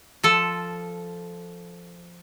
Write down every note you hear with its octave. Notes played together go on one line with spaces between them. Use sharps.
F3 A4